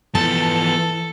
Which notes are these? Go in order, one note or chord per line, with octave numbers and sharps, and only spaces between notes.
E3 F3 B3 A4 A5